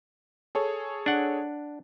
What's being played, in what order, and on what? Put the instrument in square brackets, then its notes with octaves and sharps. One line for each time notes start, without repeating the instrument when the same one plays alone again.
[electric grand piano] G#4 A4 C#5
[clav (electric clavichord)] D4 F#5